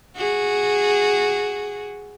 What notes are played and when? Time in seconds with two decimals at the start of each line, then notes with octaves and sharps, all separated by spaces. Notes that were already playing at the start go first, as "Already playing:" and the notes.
0.17 F#4 G#4